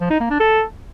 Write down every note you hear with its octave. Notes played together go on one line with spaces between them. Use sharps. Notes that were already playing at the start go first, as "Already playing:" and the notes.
F3
D#4
A#3
D4
A4